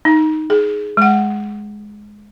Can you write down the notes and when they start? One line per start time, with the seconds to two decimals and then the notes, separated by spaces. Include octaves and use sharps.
0.05 D#4
0.50 G#4
0.97 G#3 F#5